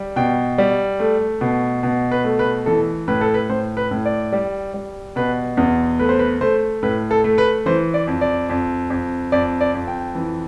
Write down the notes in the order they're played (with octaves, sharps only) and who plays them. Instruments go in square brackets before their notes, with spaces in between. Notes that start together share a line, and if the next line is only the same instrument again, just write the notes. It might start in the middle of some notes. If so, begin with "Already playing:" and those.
Already playing: [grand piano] G3
B2 G5
G3
A3
B2
B2
B4
A3
B4
E3 A4
A2 B4
A4
B4
A2 C5
B4
A2
D5
G3
G3
B2 B4
E2
A3 B4
C5
B4
A3 C5
A2 B4
A4
A3
B4
E3 C5
D5
F2
D5
F2
F2
F2 D5
D5
F2
G5
E3